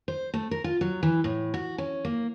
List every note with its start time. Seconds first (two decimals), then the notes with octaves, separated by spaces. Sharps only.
0.08 C5
0.34 A3
0.51 A#4
0.64 F4
0.81 F#3
1.03 E3
1.24 A2
1.54 F#4
1.78 C#4
2.05 A#3